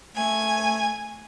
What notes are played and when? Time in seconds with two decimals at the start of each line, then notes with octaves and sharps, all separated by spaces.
0.16 A3 G#5